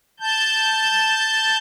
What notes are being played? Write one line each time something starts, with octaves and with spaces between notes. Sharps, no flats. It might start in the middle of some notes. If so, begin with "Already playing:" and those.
A5 G6